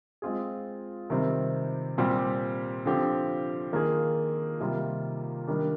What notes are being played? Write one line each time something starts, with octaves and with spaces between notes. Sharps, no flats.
G#3 C4 F4 G#4
C3 D#3 G3 C4
A#2 G3 C4 G4
D3 F3 C4 G4
D#3 A#3 F4 G#4
C3 D#3 G3 A#3 F4
D#3 G3 A#3 D4